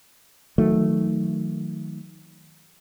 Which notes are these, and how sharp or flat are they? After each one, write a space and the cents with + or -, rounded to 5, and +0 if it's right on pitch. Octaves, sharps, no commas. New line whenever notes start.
D#3 +25 F#3 -20 A3 +0